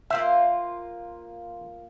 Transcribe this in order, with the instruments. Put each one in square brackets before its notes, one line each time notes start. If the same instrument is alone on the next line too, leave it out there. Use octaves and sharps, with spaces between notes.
[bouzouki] A#3 F4 C5 [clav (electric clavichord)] E5